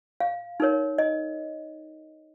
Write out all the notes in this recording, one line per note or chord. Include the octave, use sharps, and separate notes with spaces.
F5
D#4 A#4 C#5
D#5